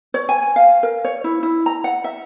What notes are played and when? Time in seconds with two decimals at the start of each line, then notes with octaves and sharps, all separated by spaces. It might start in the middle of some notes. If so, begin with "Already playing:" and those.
0.14 C#5
0.29 G#5
0.56 F5
0.83 A#4
1.05 C#5
1.24 E4
1.43 E4
1.66 A#5
1.84 F#5
2.04 E5